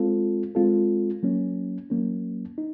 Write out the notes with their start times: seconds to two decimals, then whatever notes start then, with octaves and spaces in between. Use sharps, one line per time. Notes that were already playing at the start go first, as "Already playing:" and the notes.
Already playing: G#3 C4 F4 A4
0.55 G#3 C4 F4 A4
1.23 F#3 A#3 C#4
1.90 F#3 A#3 C#4
2.58 D#4